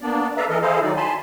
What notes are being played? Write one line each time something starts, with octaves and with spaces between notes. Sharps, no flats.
A#3 B3 D4 D5
A4 B4 D5 E5 F5 A#5
E3 A4 A#4 D#5
E4 G#4 A4 C5 D#5 F5
D#3 F#3 D#4 D5
G#5 A5 B5 C6